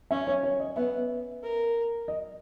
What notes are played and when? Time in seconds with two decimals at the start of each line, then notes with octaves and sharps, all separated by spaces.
0.11 C#4 E5
0.27 C#5
0.43 C#5
0.60 D#5
0.76 B3 E5
1.43 A#4
2.08 D#5